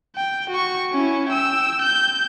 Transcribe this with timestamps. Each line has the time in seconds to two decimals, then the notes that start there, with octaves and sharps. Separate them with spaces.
0.16 G5
0.51 F#4 C#6
0.92 C#4 E4
1.29 G5 E6
1.82 G6